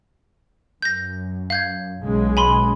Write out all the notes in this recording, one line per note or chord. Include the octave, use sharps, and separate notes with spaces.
F#2 G6 A#6
F5 G6 G#6
B1 C#3 G#3
G#5 B5 C6